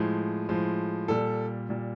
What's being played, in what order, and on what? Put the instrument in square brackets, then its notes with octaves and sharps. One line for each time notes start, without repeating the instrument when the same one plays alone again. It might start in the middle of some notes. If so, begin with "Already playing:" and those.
Already playing: [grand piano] A2 F3 G#3
A2 F3 G#3
A#2 G3 A4
A#2 G3